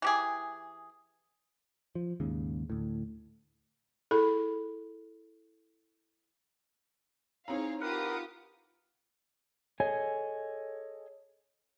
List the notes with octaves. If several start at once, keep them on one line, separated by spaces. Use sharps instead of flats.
E3 G4 G#4
F3
D#2 G#2 C#3
D2 A2
E4 G#4 A4 B5
C4 D#4 E4 G#4 C#5 F5 A#5
F4 G4 A#4 B4 F#5 D#6
G#4 A4 C#5 D#5 G#5